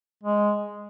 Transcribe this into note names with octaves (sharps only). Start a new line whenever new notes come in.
G#3